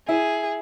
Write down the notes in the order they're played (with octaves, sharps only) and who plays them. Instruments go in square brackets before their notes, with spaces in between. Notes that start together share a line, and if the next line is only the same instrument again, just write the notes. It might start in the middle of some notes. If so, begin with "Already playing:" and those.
[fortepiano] E4 [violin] G#4